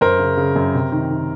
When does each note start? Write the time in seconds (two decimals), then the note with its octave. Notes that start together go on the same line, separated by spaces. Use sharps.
0.01 F#2 A#4 C5
0.19 C#3
0.37 C#3
0.56 F#2
0.75 C3
0.92 D#3
1.11 D#3